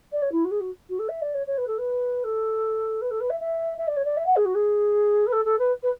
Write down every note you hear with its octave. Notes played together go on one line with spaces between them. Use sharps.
D5
C#5
E4
F#4
G#4
F#4
F#4
A4
E5
D5
C#5
C#5
B4
A4
B4
A4
B4
A4
B4
E5
E5
E5
D5
C#5
D5
E5
F#5
G#4
F#4
G#4
B4
A4
A4
B4
B4